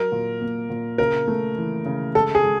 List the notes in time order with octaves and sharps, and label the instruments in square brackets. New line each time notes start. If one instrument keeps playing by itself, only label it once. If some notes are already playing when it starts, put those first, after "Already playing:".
Already playing: [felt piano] F#3 [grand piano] A#4
[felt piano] A#2
A#3
A#2
[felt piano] C#3 [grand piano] A#4
[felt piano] A3
E3
C#3
[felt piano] G#3 [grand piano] A4
[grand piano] G#4
[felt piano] G#3